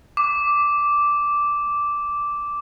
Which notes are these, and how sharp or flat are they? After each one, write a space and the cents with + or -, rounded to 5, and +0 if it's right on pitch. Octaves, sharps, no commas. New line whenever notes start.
D6 -5